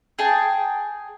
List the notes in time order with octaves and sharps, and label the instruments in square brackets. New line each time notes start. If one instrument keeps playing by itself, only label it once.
[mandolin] G#4 G5 A5